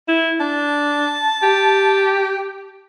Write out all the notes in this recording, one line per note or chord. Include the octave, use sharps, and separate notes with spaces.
E4
D4 A5
G4